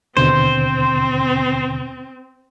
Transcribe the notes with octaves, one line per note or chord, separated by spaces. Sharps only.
D#2 B2 D3 C4 C5